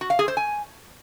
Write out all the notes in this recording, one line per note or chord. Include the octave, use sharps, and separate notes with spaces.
F#4
F5
G#4
C5
G#5